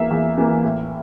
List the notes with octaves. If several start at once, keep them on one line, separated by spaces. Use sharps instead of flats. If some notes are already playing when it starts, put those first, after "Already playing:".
Already playing: E2 E3 A#3 E5 F5
E2
E3 A#3
A2